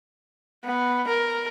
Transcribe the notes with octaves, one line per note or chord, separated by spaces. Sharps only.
B3
A#4